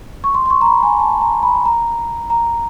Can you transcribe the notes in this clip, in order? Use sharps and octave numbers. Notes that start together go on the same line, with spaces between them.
C#6
C6
C6
C#6
A#5
B5
G#5
A5
A#5
B5
A#5
A#5